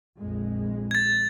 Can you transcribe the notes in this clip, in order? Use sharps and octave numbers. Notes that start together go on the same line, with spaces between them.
A#1 F2 G#3
G#6 A6